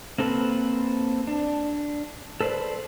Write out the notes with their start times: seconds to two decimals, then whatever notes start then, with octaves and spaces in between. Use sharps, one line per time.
0.18 A#3 C4 A4 B4
1.27 D4
2.41 A4 B4 C5 D5